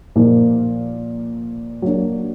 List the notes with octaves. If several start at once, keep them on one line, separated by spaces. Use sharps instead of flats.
A#2 F3 A#3 D#4
F#3 A#3 D4